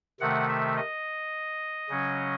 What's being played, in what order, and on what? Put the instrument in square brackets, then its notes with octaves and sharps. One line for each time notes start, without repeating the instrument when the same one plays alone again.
[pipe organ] C3 D#3 A3 F#5
E5
D#5
C#3 F#3 C#4